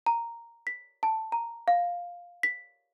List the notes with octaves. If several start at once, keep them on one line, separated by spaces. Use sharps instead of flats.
A#5
B6
A5
A#5
F5
B6